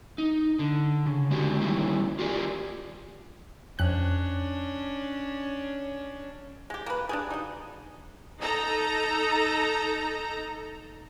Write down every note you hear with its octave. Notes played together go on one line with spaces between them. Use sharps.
D#4
D3
C#3
D3 G#3 C#4 F#4 G4
D#3 G3 A#3 C#4 E4
F4 G4 G#4 A#4 D5
F2 C#4 D4 F#6
G#3 G4
A#3 B4
D4 G4 G#4
D#4 F#4 D#5
D#4 A4 A#5